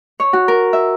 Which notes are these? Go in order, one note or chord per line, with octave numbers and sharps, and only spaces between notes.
C#5
F#4
A#4
E5